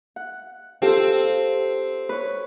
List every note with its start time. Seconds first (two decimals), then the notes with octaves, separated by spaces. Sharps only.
0.16 F#5
0.82 C4 F4 G4 A4
2.09 B4 C#5